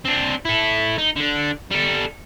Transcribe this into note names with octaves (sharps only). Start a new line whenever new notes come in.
C4 D4
E4 A4
D#4
D3 D4
G3 A4